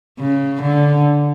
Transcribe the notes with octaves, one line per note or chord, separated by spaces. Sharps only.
C#3
D3